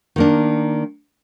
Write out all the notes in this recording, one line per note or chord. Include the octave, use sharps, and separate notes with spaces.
D#3 A#3 D4